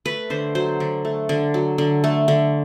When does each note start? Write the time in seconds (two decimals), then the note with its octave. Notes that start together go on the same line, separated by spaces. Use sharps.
0.05 A3 B4
0.30 D3 C5
0.55 F#3 C5
0.80 D3
1.05 A3
1.29 D3
1.54 F#3
1.78 D3
2.04 A3
2.28 D3